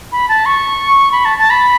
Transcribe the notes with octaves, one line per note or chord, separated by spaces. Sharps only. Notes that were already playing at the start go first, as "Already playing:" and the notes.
B5
A5
C#6
B5
A5
A5
B5